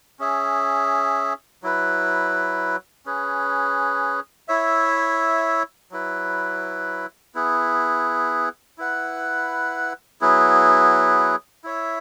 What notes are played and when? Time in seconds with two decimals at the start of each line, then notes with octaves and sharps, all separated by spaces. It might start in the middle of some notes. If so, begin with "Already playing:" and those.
0.19 C#4 G#4 E5
1.63 F#3 E4 B4
3.06 C#4 G#4 B4
4.48 E4 C#5 E5
5.91 F#3 E4 B4
7.35 B3 E4 G#4
8.78 E4 B4 F#5
10.21 F#3 B3 E4 G#4
11.64 E4 C#5 E5